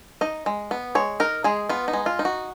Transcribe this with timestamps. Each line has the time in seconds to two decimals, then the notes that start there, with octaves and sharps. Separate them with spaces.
0.21 D#4 D#5
0.46 G#3
0.71 B3
0.95 G#3 C#5
1.20 D#4 A#4
1.44 G#3 G#4
1.69 B3 F4
1.88 D#4
1.93 G#3
2.06 F4
2.19 D#4
2.25 F#4